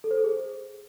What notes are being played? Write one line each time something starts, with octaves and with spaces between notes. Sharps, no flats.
A4
C5
A4
G#4
C5